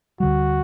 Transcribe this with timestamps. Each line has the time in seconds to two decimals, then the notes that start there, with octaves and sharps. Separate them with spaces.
0.20 D2 D3 G3 F#4